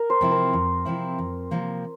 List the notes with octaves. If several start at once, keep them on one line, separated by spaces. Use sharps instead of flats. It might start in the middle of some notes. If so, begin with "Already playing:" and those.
Already playing: A#4
C5
C3 F3 C4 E4
A#4
F2
C3 F3 C4 E4
F2
C3 F3 A#3